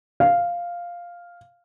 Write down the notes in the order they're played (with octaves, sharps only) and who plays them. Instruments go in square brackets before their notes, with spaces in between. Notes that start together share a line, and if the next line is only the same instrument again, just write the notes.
[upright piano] F5